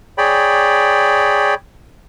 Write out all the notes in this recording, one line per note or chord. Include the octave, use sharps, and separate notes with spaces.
G#4 C#5 D5 G5 B5